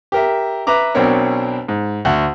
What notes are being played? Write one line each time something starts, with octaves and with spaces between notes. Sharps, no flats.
G4 A#4 E5
B4 E5 A#5 D6
B1 B2 C4 D4 A#4 C#5
G#2
D2 F#5